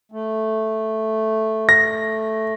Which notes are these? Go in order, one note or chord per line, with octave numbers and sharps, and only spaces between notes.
A3
A#6